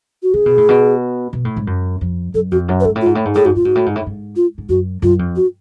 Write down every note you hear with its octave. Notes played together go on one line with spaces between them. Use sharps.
F#4
C#3 G#4
B2
A2
B2
B2
A2
G#2
F#2
F2
F#2 A4
F2 F#4
F#2
B4
G#2 A4
A2
G#2 F4
A2
G#2
A2 G#4
G#2 F#4
A2 F4
G#2 F#4
A2
G#2
A2
G#2
F4
G#2
F#2 F#4
F#2 F4
F2
F#4